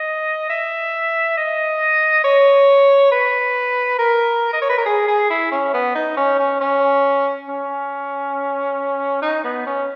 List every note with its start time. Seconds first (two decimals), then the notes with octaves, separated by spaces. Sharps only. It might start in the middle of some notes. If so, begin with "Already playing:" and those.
Already playing: D#5
0.49 E5
1.37 D#5
2.24 C#5
3.12 B4
3.99 A#4
4.53 D#5
4.62 C#5
4.69 B4
4.78 A#4
4.86 G#4
5.08 G#4
5.30 E4
5.52 C#4
5.74 B3
5.95 D#4
6.17 C#4
6.39 C#4
6.61 C#4
7.48 C#4
9.22 D#4
9.44 B3
9.66 C#4